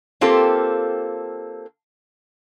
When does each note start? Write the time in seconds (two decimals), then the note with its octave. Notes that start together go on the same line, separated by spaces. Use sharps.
0.21 A#3 C4 F4 G4 A4